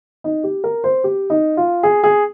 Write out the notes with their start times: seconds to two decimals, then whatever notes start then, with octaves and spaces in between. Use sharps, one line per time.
0.24 D#4
0.44 G4
0.64 A#4
0.84 C5
1.04 G4
1.30 D#4
1.57 F4
1.83 G#4
2.04 G#4